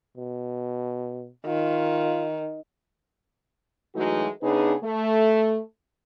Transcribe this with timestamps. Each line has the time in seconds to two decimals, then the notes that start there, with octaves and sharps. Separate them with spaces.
0.17 B2
1.46 D#3 F4
3.95 E3 F#3 G#3 A3 D#4 F#4
4.42 C#3 B3 D4 D#4 G#4 B4
4.84 A3